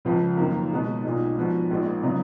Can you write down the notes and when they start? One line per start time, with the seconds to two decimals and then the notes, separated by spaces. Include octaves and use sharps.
0.05 C#2 C#3 F3
0.37 F#2 D#3 A#3
0.71 B2 G#3 B3 D#4
1.03 B1 A#2 G#3 D#4
1.37 G#2 F3 B3 F#4
1.70 A#1 A#2 G#3 D#4
2.03 C#3 F#3 B3 D#4